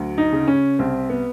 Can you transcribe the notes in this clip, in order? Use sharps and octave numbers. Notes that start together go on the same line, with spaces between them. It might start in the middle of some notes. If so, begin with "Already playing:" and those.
Already playing: D2 F#3
D#4
C#3
C#4
C2 C4
B3